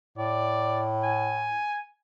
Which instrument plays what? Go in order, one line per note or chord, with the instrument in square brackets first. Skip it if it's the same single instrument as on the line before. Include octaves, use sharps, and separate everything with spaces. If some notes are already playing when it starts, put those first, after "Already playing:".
[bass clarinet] A2 [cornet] D5
[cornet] G#5